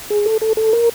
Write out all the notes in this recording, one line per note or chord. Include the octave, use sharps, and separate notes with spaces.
G#4
A4
A4
A4
A#4